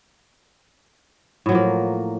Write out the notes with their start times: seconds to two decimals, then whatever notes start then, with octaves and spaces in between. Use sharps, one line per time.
1.46 A2
1.49 F#3
1.52 F3
1.55 A#3